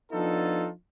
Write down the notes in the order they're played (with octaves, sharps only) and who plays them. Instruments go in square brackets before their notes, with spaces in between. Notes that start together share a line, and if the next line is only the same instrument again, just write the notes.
[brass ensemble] F3 B3 D4 D#4 F4 A4